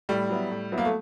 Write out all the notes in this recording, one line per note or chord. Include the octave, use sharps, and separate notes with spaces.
A2 G3
F#3 B3 E4
A2
F#3 B3 E4
A#3
A3